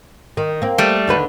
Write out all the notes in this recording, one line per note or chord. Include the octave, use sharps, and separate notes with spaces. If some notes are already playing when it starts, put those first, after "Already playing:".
D#3
A#3 C4
G3 A3
D#2 D3 B4